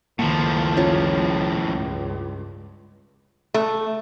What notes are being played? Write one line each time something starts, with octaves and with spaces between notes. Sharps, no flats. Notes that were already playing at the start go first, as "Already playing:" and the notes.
F#1 C#2 A2 D#3 F3 A#3
C#4 F4 C#5
C#2 G2
A3